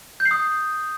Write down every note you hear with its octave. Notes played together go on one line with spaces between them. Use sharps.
G6
C7
D#6